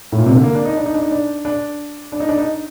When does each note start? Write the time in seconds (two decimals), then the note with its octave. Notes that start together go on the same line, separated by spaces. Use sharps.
0.12 A2
0.18 A#2
0.26 C3
0.35 D3
0.43 A#3
0.55 D4
0.65 D#4
0.77 D4
0.86 D#4
0.94 D4
1.02 D#4
1.11 D4
1.45 D4
2.12 D4
2.20 D#4
2.29 D4
2.38 D#4